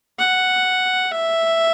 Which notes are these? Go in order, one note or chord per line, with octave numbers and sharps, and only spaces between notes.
F#5
E5